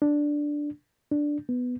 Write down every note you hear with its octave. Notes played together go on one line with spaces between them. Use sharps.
D4
D4
B3